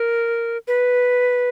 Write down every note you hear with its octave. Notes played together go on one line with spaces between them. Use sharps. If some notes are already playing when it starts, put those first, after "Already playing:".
Already playing: A#4
B4